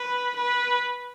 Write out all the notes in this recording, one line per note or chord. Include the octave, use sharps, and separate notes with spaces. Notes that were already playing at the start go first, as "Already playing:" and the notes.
Already playing: B4
B4